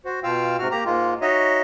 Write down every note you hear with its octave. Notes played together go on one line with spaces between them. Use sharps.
F#4 C5
B2 F4 F5 G5 E6
G#2 C3 F#4 F6
A#3 G4 A#5
G#2 G#3 A#3 F4
D#4 F#4 C#5 D#5 E5